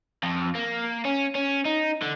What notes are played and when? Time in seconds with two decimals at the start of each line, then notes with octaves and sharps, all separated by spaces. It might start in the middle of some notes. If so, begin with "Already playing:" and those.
0.23 F2
0.55 A#3
1.05 C#4
1.35 C#4
1.65 D#4
2.02 D3